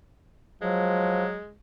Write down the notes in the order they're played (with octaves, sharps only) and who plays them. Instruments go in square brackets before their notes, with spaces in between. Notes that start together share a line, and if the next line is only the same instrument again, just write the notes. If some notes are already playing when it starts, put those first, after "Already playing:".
[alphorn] F3 [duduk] F#3 [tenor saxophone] G#3